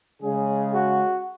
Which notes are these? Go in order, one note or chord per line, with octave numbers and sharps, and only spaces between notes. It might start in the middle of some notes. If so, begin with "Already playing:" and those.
C#3 G#3 G#4
F#4